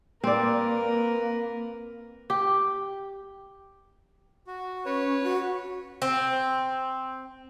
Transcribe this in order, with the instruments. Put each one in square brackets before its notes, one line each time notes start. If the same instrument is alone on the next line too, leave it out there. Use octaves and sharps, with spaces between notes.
[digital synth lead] A#3 [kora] C4 D5 [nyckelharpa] A#4 B4
[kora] G4
[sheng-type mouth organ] F#4
[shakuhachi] C#4 [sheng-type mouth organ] B4 C#5
[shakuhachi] F#4
[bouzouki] C4